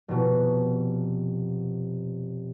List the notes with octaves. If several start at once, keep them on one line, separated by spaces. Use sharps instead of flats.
F1 B2